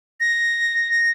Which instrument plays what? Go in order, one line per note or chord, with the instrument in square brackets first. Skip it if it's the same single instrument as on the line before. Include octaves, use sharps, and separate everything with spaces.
[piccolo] A#6